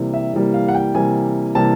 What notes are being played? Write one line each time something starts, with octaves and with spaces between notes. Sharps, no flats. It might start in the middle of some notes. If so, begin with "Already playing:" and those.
Already playing: C3 E3 G3 A#3
E5
C3 E3 G3 A#3
F5
F#5
G5
C3 E3 G3 A#3 G#5
C3 E3 G3 A#3 A5